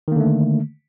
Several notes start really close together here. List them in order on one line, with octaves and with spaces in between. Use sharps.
D#3 A#3 D3 A3